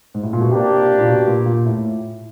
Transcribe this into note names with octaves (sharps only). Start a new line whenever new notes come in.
G#2
A2
A#2
B2
C3 A#3 D4 G4
A#2
B2
A#2
A#2
A2